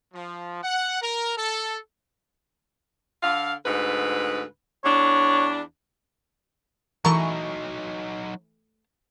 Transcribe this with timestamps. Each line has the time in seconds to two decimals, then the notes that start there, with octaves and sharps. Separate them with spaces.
0.14 F3
0.63 F#5
1.01 A#4
1.37 A4
3.22 D3 F5
3.65 D2 G#2 B4
4.84 E2 D4 C#5
7.05 E3 F#3 A3 D#4 A#4 C#6